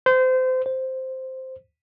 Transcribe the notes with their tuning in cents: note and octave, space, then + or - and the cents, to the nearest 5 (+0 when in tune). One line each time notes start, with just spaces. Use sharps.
C5 -30
C5 -5